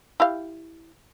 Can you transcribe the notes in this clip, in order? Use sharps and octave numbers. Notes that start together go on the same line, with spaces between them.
E4 G4 F5